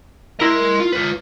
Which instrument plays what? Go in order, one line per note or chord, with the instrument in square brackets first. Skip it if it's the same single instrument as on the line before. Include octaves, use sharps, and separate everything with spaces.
[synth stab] E4 A#4 [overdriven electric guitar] D#5 C6
[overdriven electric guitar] F4
F4 B4